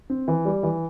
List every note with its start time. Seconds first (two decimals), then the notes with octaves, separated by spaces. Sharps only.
0.10 C4
0.28 E3
0.45 G3
0.63 E3